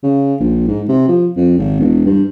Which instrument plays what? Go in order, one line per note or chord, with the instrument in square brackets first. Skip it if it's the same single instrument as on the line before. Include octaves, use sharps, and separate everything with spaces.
[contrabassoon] C#3
A#1
G#2
C3
F3
F2
G#1
E1
G2